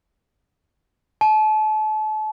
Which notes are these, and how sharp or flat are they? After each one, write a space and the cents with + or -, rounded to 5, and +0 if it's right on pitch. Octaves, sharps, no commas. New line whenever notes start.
A5 -35